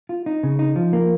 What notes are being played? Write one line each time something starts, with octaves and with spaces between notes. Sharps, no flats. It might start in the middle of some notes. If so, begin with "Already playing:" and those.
F4
D#4
C#3
D#4
F3
A#3